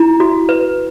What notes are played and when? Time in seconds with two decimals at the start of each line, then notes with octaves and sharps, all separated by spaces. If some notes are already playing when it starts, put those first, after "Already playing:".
Already playing: E4 A#5
0.20 F#4
0.49 B4